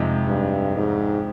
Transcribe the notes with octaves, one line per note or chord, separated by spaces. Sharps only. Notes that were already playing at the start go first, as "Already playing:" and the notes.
Already playing: F2 C3 F3 G#3 D#4
G2
G#2